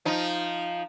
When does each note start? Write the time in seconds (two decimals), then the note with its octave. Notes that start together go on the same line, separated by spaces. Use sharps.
0.05 F3 D#4